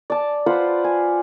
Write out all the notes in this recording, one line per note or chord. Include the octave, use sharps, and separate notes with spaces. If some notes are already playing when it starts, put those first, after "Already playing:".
D5 A5
F4 B4 C5 F#5
G#5